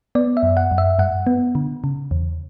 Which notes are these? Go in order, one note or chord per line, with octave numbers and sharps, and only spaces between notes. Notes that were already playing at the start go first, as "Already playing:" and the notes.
B3 D5
E5
F#2
F#5
F#2
E5
G2 F#5
B3
D3
C#3
E2